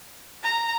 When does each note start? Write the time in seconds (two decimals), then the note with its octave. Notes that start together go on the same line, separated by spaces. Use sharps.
0.43 A#5